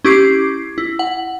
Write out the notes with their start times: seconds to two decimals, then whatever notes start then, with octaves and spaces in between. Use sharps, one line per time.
0.04 C#4 E4 G4 D6 G#6 C7
0.78 E4
0.99 F#5